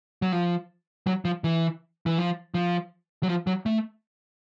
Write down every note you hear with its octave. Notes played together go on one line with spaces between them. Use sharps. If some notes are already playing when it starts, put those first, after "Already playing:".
F#3
F3
F#3
F3
E3
E3
F3
F3
F#3
F3
F#3
A3